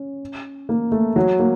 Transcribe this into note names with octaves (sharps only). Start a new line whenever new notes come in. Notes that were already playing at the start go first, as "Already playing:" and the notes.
Already playing: C#4
A#3
A3
F#3
A#3